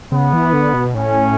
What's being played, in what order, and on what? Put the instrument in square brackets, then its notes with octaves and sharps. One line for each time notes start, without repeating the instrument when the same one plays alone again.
[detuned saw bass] C#3 [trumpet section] B3
[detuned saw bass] E3
D3
B2
[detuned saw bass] A2 [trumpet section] C#4